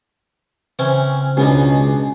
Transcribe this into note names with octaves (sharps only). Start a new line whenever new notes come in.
C#3 E3 C4 C#4
C#2 B2 B3 D4 D#4 G#4